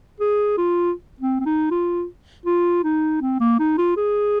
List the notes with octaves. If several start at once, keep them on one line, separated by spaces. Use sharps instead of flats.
G#4
F4
C4
C4
D#4
F4
F4
D#4
C4
A#3
D#4
F4
G#4